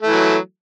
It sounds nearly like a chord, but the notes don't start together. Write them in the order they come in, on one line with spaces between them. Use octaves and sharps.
A3 E3 F#3